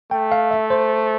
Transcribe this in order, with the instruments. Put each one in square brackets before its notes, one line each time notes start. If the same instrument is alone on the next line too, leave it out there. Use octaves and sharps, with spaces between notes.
[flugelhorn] A3 [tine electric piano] G5
[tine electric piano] F5
E5
C5